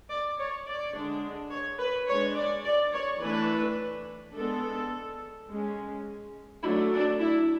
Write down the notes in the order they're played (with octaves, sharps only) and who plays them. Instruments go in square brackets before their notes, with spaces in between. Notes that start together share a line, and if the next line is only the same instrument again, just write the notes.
[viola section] D5
C#5
D5
D3 G#3 D4
C#5
B4
G#3 D4 C#5
D5
D5
C#5
E3 A3 D4 B4
G#3 B3 D4 A4
G#3 C#4
F#3 A3 D4 E4
D4
E4